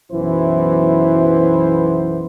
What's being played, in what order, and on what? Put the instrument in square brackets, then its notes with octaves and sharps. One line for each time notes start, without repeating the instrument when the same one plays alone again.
[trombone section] B1 F#2 E3 B3 E4 C5